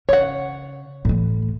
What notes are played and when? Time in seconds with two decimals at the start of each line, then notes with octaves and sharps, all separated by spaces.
0.09 C#3 C#5 F#5
1.05 A2 E3